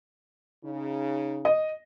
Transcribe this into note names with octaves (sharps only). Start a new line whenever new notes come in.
C#3 D#4
D#5